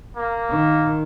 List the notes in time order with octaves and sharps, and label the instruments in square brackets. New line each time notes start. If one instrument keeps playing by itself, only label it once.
[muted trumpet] A#3
[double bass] D#3